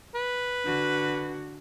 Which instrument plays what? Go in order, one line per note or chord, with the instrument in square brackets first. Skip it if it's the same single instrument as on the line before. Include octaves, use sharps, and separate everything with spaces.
[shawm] B4
[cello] D3 F#4